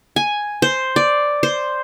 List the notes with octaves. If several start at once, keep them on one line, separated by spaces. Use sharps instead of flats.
G#5
C5
D5
C5